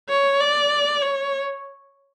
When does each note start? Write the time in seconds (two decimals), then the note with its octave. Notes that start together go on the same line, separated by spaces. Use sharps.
0.09 C#5
0.40 D5
1.02 C#5